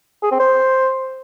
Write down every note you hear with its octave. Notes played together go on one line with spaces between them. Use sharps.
G#4
C4
C5